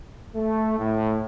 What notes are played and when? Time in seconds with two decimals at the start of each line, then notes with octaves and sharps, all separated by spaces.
0.36 A3
0.79 A2